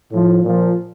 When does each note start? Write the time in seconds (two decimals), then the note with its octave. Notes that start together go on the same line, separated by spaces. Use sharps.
0.12 A2 F3
0.43 A#2 F3